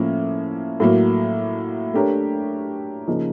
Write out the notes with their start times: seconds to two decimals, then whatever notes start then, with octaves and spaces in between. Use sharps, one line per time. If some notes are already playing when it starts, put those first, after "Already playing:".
Already playing: A2 F3 A#3 C#4
0.80 A2 F#3 A#3
1.94 A3 D4 G4 A#4 C#5
3.08 C#3 F3 A#3 D#4